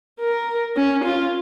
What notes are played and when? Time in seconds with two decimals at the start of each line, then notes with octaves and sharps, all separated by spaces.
0.20 A#4
0.77 C#4
1.04 F4